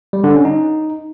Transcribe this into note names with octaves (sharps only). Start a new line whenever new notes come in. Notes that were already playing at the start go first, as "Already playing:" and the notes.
G3
D3
C#4
D#4